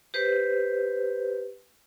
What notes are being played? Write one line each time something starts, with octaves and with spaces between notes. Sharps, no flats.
G4 B4 C5